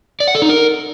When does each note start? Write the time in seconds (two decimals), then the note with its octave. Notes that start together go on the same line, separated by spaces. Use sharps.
0.20 D5
0.28 F#5
0.35 A4
0.42 D#4
0.49 A#4